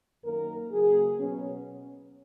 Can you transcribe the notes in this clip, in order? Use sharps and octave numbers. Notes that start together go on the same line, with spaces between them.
F#2 D#3 A#3 A#4
C#3 F#3 A#3 G#4
B2 F#3 B3 C#4